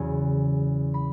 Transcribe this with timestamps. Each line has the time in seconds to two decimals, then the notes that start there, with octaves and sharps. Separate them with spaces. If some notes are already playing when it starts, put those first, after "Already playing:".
Already playing: E2 C#3 F#3 C#4 G#5
0.94 B5